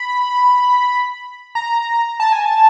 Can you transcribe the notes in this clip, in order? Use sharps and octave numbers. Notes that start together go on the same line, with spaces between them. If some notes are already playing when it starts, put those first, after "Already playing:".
Already playing: B5
A#5
A5
G#5
A5